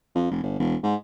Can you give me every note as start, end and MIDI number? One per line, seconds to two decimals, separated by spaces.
0.15 0.30 41
0.31 0.41 29
0.43 0.58 31
0.59 0.75 28
0.83 0.95 44